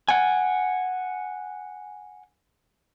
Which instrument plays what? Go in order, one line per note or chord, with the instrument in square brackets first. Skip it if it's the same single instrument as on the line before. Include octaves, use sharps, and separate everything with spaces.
[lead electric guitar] F#5 G#5